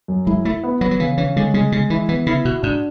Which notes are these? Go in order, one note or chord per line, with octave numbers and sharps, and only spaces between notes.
F#2
G#3 E4
A3 E4
B3
F#3 B3
F#3
C#3 E3
E3 C#4
D3 G#3
C#3 G#3
C#3 G#3
E3 E4
E3 B3
C#3 E4
B2 F#4
G#2 D4